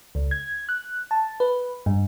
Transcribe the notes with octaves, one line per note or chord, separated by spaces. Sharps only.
C#2
G#6
F#6
A5
B4
G2